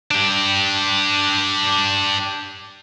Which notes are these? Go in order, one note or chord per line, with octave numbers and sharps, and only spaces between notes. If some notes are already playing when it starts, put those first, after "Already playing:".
D4 G4